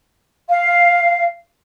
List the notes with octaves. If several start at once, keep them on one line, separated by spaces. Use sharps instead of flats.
F5